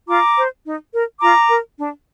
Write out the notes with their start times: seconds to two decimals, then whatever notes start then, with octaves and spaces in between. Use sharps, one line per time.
0.08 F4 A#5 D6
0.37 C5
0.65 D#4
0.93 A#4
1.21 F4 A#5 D6
1.50 A#4
1.78 D4